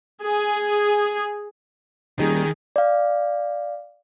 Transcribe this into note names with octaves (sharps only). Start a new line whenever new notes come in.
G#4
D#1 D#3 G3 D#4 G#4
D5 F5